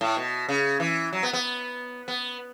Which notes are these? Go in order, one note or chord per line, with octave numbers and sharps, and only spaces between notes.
A2
B2
C#3
E3
F#3
B3
B3
B3